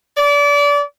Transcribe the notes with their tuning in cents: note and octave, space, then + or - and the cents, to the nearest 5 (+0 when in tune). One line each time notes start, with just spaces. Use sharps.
D5 -30